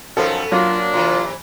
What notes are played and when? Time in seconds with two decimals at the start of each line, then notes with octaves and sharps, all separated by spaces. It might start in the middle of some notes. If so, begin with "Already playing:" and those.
0.17 F#2 D#3 F3 B3 C#4 A4
0.52 F#3 A#3 D4 F4
0.93 C3 E3 F4